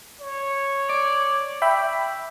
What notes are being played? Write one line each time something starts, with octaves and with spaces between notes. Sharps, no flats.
C#5
D5
E5 G5 B5